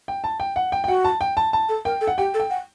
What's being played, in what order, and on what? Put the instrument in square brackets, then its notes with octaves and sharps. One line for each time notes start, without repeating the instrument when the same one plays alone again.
[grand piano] G5
A5
G5
F#5
G5
G5
[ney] F#4 [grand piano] F#5
[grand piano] A5
G5
A5
A5
[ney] A4
[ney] A#4 [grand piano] G5
[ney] A4
[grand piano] F#5
[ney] G4 [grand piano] G5
[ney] A4
[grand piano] G5
[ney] F#5